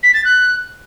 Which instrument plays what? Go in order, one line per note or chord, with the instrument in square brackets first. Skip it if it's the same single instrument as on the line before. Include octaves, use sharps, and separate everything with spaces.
[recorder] B6
A6
F#6